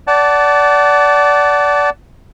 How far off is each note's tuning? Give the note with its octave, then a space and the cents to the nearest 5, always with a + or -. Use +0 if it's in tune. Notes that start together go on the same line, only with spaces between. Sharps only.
D5 -20 F#5 +25 A5 -5